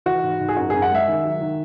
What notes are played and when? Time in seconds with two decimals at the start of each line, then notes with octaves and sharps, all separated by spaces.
0.06 E3 F#4
0.23 G#2
0.40 G#2
0.49 G#4
0.57 F#2 F#4
0.70 F#2 G#4
0.82 F#5
0.91 G#3 E5
1.08 D#3
1.25 F#3
1.41 D#3